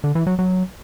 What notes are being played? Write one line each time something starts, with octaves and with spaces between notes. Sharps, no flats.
D3
E3
F#3
F#3